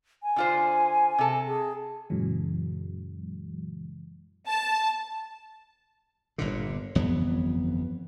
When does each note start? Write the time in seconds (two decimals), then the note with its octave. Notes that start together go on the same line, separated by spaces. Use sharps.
0.23 G#5
0.36 D3 F4 C5
1.19 C3 A4
1.48 G#4
2.10 F#2 A#2 C#3 E3 F#3 G#3
4.48 A5
6.38 G1 A#2 D3
6.95 G1 F2 E3 B3